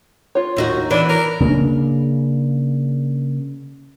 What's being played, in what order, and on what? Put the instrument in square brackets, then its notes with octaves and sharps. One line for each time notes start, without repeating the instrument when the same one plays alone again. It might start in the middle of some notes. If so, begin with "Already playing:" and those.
[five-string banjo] F4 C#5
[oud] D#2 D#4 F#4
[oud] E3 [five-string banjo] B3 C#5 [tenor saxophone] D4
[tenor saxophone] A#4
[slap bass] C#3 A#3 C4 D4